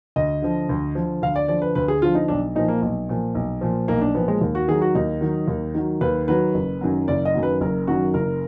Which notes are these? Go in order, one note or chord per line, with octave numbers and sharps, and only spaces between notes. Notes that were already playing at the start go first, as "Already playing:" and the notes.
D2 D#5
D3 F3
D2
D3 F3
D2 F5
D5
D3 F3 D5
B4
D2 B4
G#4
D3 F3 F4
D#4
B1 D4
A#2 F3 D#4
A#3
B1
A#2 F3
B1
A#2 F3
B1 A#3
D4
A#2 F3 B3
G#3
D#2
F#4
D#3 F#3 G#4
F#4
D#2 D#4
D#3 F#3
D#2
D#3 F#3
D#2 B4
D#3 F#3 B4
F#1
F#2 D#3 F#3
F#1 D5
D#5
F#2 D#3 F#3
B4
F#1 A#4
F#2 D#3 F#3 F#4
F#1 A#4